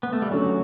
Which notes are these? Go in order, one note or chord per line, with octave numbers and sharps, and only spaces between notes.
B3
A3
G3
D3 F#3 A3 C#4